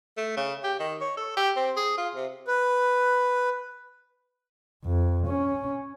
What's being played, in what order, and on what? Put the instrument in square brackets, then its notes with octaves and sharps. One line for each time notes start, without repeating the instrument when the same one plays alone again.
[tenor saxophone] A3
C#3
G4
D#3
C#5
A4
G4
C4
G#4
F4
C3
[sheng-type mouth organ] B4
[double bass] F2
C#4